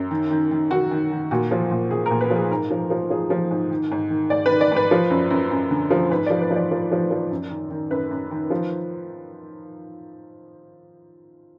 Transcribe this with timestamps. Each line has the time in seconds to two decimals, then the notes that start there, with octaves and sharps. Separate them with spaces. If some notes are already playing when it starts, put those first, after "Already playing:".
Already playing: F#2
0.11 D#3
0.31 D#3
0.51 D#3
0.70 D#3 F#4
0.91 D#3
1.11 D#3
1.31 A#2 F#4
1.51 F3
1.71 A#2
1.91 A#2 G#4
2.06 A#2 A#4
2.21 B4
2.30 F3
2.36 G#4
2.51 G#2 A#4
2.71 F3
2.90 F3
3.10 F3 G#4
3.30 F3
3.51 G#2
3.71 D#3
3.91 G#2
4.10 D#3
4.30 G#2 D5
4.46 B4
4.51 D#3
4.61 D5
4.71 G#2
4.76 B4
4.91 F3
5.10 F#2
5.30 F#2
5.51 F#2
5.71 D3
5.90 F3
6.10 G#2 B4
6.26 F3 D5
6.41 B4
6.50 F3
6.56 D5
6.71 F3
6.91 F3
7.11 F3
7.31 F#2
7.50 D#3
7.70 D#3
7.90 F#2 B4
8.11 F#2
8.31 D#3
8.50 F3